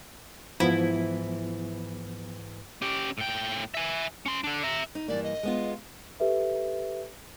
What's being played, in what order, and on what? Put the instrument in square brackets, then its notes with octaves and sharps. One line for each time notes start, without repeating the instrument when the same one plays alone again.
[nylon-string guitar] G#2 E3 [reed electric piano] F3 B3 [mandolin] E4
[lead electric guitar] C#4 G4
A2 G5
E5 G#5
C#4 C6
D3 D4
E5 A#5
[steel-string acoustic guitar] D#4
[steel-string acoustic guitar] G2 E3 A#3 [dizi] D5
[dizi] D#5
[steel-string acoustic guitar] G#3 B3 F4
[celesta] G4 A4 B4 E5